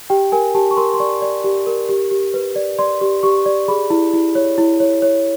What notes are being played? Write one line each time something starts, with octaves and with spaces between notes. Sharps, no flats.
G4 G5
A#4 G#5
G4 A5
C#6
A#4 C6
C6
D5 C#6
D5
G4
A#4
G4
G4
B4
D5
D5 C6
G4
G4 C#6
D5
G#4 B5
E4
E4
C#5
E4
C#5
C#5